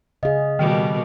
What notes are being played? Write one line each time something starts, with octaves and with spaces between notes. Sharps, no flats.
C#3 G#4 D#5 F5
B2 D#3 G3 A#3